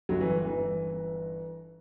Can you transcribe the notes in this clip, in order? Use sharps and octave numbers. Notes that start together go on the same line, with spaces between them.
G1 F#3
E3
E3
G1
E3